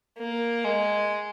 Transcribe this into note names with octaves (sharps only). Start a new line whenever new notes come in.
A#3
G#3